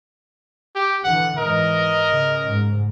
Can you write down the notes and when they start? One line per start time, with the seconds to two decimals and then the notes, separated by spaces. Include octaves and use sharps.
0.75 G4
1.04 D3 E3 F#5
1.38 G#2 E3 A#4 D#5
2.11 C#3
2.48 G#2